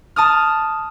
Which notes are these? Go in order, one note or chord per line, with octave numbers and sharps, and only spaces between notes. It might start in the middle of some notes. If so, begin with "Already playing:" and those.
A5 D#6 F6